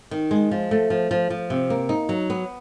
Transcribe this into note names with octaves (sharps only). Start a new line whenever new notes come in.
D#3
G#3
F3
A3
F3
F3
F3
C3
A#3
D#4
F#3
B3